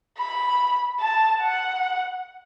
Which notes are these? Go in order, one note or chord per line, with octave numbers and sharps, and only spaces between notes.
B5
A5
F#5